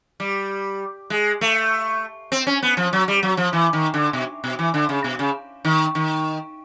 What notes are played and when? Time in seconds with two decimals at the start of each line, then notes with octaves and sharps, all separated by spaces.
0.20 G3
1.10 G#3
1.41 A3
2.32 C4
2.47 C#4
2.63 B3
2.77 F3
2.93 F#3
3.08 G3
3.23 F#3
3.37 F3
3.53 E3
3.73 D#3
3.94 D3
4.13 B2
4.44 B2
4.59 E3
4.74 D3
4.89 C#3
5.04 B2
5.19 C#3
5.65 D#3
5.95 D#3